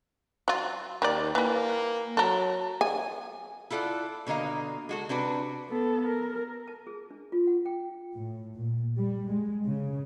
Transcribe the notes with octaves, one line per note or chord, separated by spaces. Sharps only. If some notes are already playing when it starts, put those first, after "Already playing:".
F#3 F4
D#2 D#3 D5
E3 G3 A#3
F#3 A4 A#4
G#5
E4 F4 A4 D5 F#5
B2 D3 A#3 D#5 F5
G#3 F#4 A4
C3 D4 F#4 B4
B3 A4
A#4
A5
G#4
D4
F4
F#5
G5
A2
A#2
G3
G#3
C#3